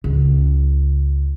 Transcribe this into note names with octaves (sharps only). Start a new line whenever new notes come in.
C#2